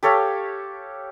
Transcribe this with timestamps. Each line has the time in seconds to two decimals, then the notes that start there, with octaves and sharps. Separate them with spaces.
0.03 G4 A4 C#5 F5